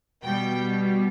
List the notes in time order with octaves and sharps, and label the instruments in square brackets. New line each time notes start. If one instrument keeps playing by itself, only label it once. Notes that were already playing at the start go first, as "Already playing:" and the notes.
[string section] B2 G3 G5